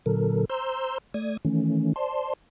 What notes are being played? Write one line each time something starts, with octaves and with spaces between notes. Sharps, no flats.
A#2 D3 F#3 A4 A#4
C5 A#5 C6 E6 G6
A3 D5 D#6 G#6
D#3 E3 A3 C#4
C5 D5 A5 C6